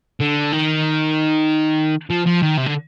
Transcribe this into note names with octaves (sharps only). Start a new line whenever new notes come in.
D3
D#3
F3
F3
D#3
C3
D3